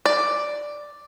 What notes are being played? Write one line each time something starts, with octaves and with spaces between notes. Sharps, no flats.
D5